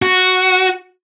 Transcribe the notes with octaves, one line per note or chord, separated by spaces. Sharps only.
F#4